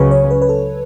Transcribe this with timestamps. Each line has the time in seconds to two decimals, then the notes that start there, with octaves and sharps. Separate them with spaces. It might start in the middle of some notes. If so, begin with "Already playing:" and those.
Already playing: C#2 C#3 F#3 C#4 B4
0.11 C#5
0.31 B4
0.42 B4
0.49 A4